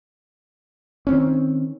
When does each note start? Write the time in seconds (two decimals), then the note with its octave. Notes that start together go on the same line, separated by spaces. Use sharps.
1.07 D#3 C4 C#4